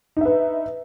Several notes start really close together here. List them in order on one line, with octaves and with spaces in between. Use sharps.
D#4 E5 B4